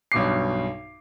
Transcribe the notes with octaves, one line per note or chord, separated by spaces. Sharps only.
B1 G2 B2 D6 C7